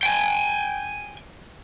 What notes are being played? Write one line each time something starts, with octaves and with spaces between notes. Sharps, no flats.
G5 G#5